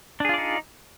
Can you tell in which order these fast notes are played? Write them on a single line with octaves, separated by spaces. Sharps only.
D4 G#4 F4 D5 D#4